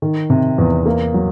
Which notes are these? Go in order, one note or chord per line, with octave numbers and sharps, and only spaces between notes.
D#3
C3
E2
A#3
F#3